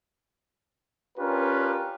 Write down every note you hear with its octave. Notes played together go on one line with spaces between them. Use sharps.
C#4 D4 F4 G4 A#4 B4